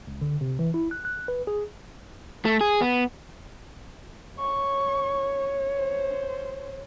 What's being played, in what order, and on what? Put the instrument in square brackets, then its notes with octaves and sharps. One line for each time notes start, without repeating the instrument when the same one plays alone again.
[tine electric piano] C#2
D3
C3
E3
E4
F#6
F#6
B4
G#4
[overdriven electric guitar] A3
G#4
B3
[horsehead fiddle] C#5 [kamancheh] C#6
[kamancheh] C5